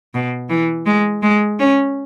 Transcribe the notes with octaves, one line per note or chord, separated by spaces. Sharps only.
B2
E3
G#3
G#3
C#4